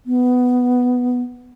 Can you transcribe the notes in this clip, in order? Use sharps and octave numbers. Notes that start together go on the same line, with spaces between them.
B3